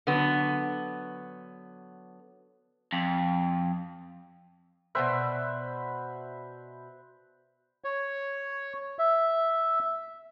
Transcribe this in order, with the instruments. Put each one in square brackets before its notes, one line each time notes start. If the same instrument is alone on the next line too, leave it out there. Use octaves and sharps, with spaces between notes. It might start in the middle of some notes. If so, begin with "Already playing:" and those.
[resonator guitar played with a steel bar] D3 F#3 B3
[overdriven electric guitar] F2
[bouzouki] B2 G#3 D5 [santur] B4 C5 E5
[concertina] C#5
E5